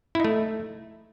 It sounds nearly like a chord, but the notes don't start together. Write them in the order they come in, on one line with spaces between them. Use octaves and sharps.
E4 D#4 A3